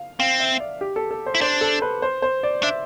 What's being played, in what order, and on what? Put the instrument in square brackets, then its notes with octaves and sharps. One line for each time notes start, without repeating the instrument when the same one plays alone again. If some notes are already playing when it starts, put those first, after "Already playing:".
Already playing: [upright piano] F5
[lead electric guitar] C4 [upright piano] F5
[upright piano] E5
D5
G4
A4
A4
C5
[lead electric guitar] E4
[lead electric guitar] D4 [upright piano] C5
[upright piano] A4
B4
C5
C5
D5
[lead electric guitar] D4 [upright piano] E5